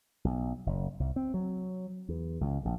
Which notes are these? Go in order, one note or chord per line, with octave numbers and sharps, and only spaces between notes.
B1
F#1
C2
C4
F#3
E2
C#2
A#1